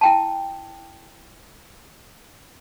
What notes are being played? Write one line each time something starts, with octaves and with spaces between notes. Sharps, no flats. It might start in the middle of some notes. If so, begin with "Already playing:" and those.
E4 G5 A5